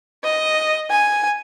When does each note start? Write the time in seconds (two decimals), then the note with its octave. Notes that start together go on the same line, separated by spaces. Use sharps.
0.23 D#5
0.90 G#5